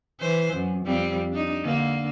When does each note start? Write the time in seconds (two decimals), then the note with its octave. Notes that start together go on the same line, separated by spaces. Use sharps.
0.20 E3 C5
0.54 F#2
0.85 F2 G3 C4
1.32 D4 D#4
1.63 D3 A#3